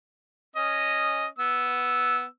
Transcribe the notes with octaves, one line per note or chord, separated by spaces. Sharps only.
C#4 D#5
B3 E6